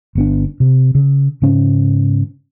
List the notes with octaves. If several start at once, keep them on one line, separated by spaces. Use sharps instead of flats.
G1 B3 D4
C3
C#3
G#2 C#3 C#4